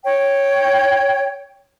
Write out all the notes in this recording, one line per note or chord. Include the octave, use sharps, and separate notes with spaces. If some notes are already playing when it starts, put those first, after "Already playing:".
C#5 G5